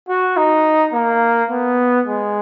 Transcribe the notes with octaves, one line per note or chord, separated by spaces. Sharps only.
F#4
D#4
A#3
B3
G#3